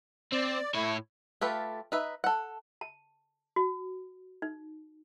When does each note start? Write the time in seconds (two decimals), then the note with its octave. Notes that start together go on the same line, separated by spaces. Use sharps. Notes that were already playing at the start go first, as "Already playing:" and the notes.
0.33 C4 D5
0.75 A2 A3 E4 C#5
1.41 A3 F4 G4 A4 B4
1.92 D#4 B4 E5
2.24 A4 F#5
2.81 A5
3.56 F#4
4.42 D#4